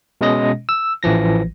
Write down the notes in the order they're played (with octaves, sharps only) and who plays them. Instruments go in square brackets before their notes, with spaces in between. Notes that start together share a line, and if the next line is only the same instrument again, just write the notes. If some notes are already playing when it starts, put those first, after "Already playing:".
[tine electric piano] B2 G#3 C#4 D#5 A#6
E6
A1 E3 F3 A#6